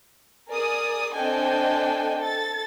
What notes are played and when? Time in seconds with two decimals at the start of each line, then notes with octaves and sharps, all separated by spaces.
0.50 G#4 A#4 D5 D#6
1.13 C4 D4 A4 D#5 G5 G#5
2.20 A4 A6